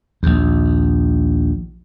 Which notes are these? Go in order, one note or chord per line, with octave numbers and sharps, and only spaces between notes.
A#1 D#2